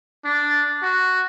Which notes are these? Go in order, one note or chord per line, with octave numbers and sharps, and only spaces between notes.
D4
F#4